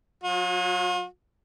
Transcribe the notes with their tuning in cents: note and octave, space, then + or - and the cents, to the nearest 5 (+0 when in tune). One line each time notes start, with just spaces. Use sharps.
F#3 -25 F4 +45